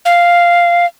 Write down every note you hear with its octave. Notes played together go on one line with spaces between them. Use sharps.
F5